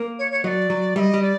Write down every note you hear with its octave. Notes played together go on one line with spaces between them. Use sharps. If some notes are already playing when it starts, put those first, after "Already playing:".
Already playing: A#3
C#5
C#5
F#3 D5 D#5
F#3
G3 D#5 E5
G3
D5